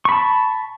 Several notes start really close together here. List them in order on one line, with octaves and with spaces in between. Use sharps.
C#6 B5 A5